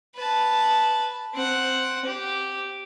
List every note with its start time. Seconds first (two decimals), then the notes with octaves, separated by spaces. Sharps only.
0.16 B4 A5
1.34 C4 F#5
2.05 G4